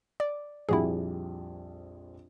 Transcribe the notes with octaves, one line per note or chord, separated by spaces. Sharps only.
D5
A#1 F2 G3 E4 F#4 G#4